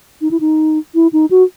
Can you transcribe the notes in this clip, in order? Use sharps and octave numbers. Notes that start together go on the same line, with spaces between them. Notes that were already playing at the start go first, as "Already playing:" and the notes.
D#4
E4
D#4
E4
D#4
F#4